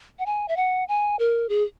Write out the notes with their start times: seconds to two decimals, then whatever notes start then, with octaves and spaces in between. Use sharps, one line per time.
0.19 F#5
0.26 G#5
0.48 E5
0.57 F#5
0.88 G#5
1.19 A#4
1.49 G#4